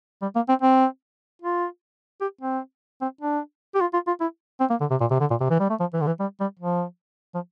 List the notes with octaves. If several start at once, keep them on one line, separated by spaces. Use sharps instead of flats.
G3
A#3
C4
C4
F4
G4
C4
C4
D4
G4
F4
F4
F4
E4
C4
A#3
D3
C3
A#2
C3
D3
A#2
C3
E3
G3
A3
F3
E3
D3
E3
G3
G3
F3
F3